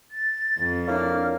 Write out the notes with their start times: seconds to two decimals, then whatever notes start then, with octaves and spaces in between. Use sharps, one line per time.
0.11 A6
0.58 F2
0.88 A#3 D4 E4 C#5 F6